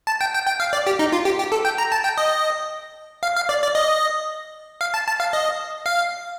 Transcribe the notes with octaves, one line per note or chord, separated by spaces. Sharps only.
A5
G5
G5
G5
F5
D5
G4
D#4
F4
G4
G4
A4
G5
A#5
A5
G5
D#5
F5
F5
D5
D5
D#5
F5
A5
A5
F5
D#5
F5